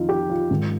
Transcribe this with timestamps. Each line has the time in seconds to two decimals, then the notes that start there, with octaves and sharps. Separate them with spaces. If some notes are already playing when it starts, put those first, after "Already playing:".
Already playing: F2 D#3 D#4 F4
0.09 G4
0.29 F4
0.51 G#2 D#3